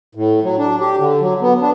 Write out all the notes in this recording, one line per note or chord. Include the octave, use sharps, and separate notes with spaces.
A2
F#3
D4
G4
D3
F#3
B3
D4